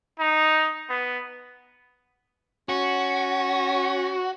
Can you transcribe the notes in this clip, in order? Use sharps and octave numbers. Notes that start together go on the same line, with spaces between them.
D#4
B3
C#4 F#4